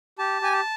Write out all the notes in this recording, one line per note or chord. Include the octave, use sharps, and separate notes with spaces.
G4 A5
G4 G#5
A5